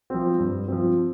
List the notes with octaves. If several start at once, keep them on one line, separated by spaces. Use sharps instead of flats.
F3 C4
G2
F3 C4